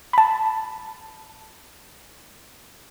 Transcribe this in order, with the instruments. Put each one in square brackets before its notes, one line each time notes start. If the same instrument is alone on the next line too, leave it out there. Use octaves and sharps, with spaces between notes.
[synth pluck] A5 B5